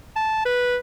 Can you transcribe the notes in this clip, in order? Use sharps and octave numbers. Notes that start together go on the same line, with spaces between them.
A5
B4